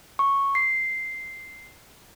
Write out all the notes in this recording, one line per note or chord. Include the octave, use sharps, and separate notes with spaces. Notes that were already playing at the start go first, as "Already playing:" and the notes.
C#6
C7